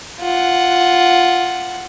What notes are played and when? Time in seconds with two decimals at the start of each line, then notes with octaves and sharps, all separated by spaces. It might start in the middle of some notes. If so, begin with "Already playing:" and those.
0.21 F4 F#5